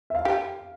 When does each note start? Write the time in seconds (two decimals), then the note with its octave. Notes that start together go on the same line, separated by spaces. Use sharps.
0.10 E5
0.15 F5
0.25 G4